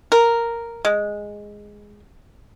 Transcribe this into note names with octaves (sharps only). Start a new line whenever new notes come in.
A#4
G#3